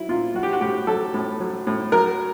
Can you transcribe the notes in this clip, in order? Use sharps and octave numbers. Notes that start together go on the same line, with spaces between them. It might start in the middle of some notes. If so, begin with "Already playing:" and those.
Already playing: F#3 E4
A#2 F4
F#3 F#4
G4
F#4
A2 G4
F#3 A4
A2
F#3
A2
F#3 A#4